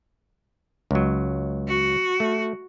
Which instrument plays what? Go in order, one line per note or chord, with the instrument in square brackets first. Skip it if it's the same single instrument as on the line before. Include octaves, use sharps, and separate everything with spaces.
[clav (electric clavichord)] C#2 F#3
[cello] F#4
[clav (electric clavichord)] A3